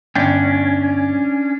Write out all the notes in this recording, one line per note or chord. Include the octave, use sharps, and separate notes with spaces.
G1 C#4 D4 G5